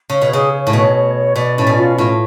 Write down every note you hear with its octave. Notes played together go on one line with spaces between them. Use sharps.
C#3 C#5
B2
C#3 G#4
C#5
A2
B2 C#5
C#5
C#5
B2 D5
A2 C#4
B2
F4
A2 F4